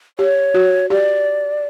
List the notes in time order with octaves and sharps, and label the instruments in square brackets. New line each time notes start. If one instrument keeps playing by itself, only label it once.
[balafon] G4 [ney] C#5
[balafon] F#4
[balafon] G4 [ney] D5